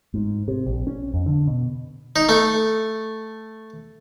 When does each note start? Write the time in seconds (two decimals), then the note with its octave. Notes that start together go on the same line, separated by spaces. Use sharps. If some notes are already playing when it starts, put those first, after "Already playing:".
0.14 G#2
0.48 C3
0.66 A#1
0.87 C#4
1.14 F2
1.26 D3
1.47 B2
2.16 D#4
2.29 A3